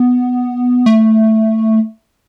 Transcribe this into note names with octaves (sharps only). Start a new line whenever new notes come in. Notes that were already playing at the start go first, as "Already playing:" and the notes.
Already playing: B3
A3